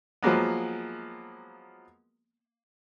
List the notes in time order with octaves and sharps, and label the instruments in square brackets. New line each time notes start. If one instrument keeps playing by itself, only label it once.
[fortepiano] F3 F#3 G#3 A#3 B3